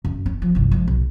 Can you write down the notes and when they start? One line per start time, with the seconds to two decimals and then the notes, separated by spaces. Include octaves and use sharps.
0.05 F#2
0.26 C#4
0.42 F3
0.55 G1 C2
0.72 F3 G#3
0.88 B1